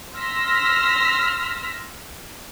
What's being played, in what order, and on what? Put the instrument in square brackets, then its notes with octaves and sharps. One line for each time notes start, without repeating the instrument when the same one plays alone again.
[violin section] C6 E6 F6 A#6 B6